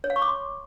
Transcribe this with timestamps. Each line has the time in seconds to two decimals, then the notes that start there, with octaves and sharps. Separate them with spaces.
0.04 C#5
0.10 F5
0.16 C#6
0.22 D6
0.28 C6